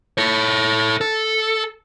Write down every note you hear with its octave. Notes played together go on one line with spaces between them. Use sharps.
A4 C#5
A4